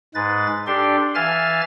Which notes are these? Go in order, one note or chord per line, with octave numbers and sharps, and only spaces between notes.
G#2 G#3 B4 A6
D4 G4 A4 D5 C6
E3 E5 F5 G#5 F6 A6